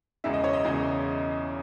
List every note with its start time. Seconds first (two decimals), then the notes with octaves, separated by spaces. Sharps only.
0.24 E1 E2 C#3 G#3 E5
0.34 D#5
0.44 C#5
0.53 D#5
0.64 E1 E2 C#3 G#3